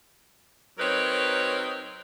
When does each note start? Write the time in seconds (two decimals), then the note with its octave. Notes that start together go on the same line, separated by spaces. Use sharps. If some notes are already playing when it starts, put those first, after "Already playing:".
0.78 F#3 C4 D#4 A#4 B4 C#5